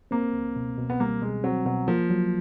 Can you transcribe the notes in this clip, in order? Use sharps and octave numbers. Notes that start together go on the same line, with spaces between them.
A#3 C4
C#2
B2
B2
B3
G3 A#3
B2 G#3
F#3 C4
B2 F#3
F3 A#3
F#3